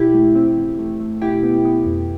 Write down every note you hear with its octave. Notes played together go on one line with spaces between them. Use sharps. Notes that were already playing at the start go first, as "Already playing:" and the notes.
Already playing: B2 E4 G4
A3
C4
E2
A3
A3
B2 E4 G4
B3
B3
F2